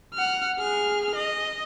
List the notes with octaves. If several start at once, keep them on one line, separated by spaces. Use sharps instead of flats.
F#5 F6
G#4 F6
D#5